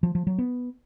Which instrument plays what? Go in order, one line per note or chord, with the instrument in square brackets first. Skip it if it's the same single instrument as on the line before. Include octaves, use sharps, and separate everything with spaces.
[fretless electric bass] F3
F3
F#3
B3